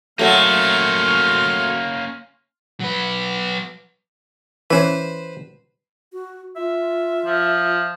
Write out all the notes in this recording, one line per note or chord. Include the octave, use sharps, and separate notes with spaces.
F#3 A3 A#3 C#4 F5 C6
F#3 B4
E3 C#4 B4 C5
F#4
F4 E5
F3